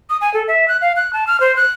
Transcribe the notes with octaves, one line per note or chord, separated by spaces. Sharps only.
D#6
G#5
A4
E5
F#6
F5
F#6
A5
F6
C5
F#6